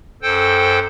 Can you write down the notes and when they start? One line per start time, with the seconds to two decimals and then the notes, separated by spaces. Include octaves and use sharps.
0.22 F#2 A4 C5 G5